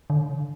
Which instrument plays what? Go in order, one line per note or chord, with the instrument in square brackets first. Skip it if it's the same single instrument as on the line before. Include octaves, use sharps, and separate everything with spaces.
[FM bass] D3